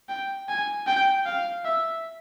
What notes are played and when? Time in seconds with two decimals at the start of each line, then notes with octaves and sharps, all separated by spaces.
0.09 G5
0.49 G#5
0.87 G5
1.26 F5
1.65 E5